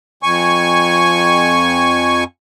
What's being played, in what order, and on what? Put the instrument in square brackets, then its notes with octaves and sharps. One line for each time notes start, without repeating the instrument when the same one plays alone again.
[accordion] F2 G#5 C#6